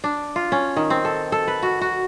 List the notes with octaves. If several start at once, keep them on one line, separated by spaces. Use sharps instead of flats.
D4
F4
C#4
D#3
C4
A4
A4
B4
F#4
F#4